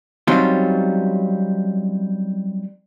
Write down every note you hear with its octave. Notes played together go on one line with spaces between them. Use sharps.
F#3 G3 C4 C#4 D#4 F4